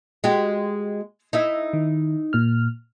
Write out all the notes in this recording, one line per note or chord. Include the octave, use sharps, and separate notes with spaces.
G#3 F#4 G4
D#4 E4 E5
D#3
A#2 F6